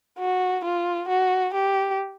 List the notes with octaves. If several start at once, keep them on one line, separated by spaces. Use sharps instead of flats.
F#4
F4
F#4
G4